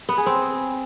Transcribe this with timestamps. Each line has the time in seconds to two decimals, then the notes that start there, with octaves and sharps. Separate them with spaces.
0.09 B3
0.18 G#4
0.26 C4